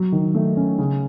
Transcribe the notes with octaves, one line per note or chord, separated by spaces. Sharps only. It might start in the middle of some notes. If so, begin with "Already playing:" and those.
Already playing: F#3
D#3
A3
C#4
C#3